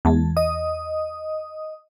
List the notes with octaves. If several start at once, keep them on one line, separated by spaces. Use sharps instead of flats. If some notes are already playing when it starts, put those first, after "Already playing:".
E2 G#3 A5
D#5 D#6